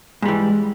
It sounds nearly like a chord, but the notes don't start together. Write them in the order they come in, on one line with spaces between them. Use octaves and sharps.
G#2 G3 E3